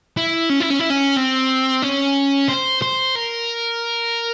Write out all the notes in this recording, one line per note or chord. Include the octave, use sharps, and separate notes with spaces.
E4
C#4
E4
C#4
E4
C#4
C4
C#4
C5
C5
A#4